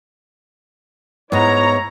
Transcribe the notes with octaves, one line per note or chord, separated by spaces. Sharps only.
G#2 B3 E4 C#5 A#5